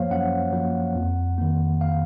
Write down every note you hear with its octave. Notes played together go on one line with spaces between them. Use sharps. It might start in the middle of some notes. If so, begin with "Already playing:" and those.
Already playing: F#2 F3 A#3 C5 C#5 F5
F#2 F#5
F3 A#3
F2
D#3 A#3
F5